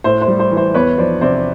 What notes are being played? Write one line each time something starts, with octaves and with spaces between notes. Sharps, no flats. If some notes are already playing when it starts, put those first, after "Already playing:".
A2 C5
C5
G3
C5
E3
C5
E2 B4 C#5
F3 C5 D5
C3 C5 D5